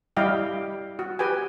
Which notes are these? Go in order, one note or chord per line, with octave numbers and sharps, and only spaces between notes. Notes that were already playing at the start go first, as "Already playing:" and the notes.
G3 E4 G4 D#5 F5 G5
F#4
G4 B4 G5 G#5